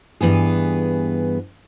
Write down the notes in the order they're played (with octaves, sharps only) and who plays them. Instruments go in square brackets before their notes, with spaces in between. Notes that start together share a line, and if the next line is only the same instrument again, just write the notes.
[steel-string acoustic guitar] G2 E3 B3 G#4